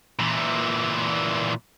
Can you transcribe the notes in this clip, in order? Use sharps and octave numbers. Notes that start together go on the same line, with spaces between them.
A#2 E3